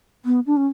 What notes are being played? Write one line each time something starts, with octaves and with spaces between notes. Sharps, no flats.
B3
D4
C#4